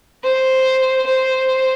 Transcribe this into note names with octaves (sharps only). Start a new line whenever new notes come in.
C5
C5